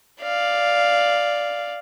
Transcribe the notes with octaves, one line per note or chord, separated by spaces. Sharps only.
D5 F5